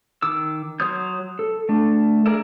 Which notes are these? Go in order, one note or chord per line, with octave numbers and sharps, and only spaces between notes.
D#3 D6 E6
F#3 C#5 C6 D#6 G6
A4
A3 D4
G#4 A#4 D5 E5